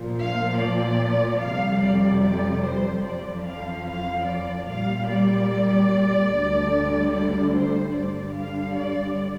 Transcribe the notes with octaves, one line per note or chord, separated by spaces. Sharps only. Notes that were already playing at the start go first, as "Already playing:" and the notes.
Already playing: A#2 F3
F5
D5
F2 C3 G3 F5
D5
D5
C5
F2 F3 D5
F5
F5
D5
A#2 G3 F5
D5
D2 D3 G3
D5
C5
G2 D3 G3 D5
F5
D5